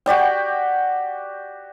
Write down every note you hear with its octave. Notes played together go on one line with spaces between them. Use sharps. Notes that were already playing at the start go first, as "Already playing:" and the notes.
F#4 G4 D5 G5